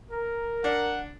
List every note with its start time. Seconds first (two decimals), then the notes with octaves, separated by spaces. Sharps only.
0.10 A#4
0.64 D4 F#5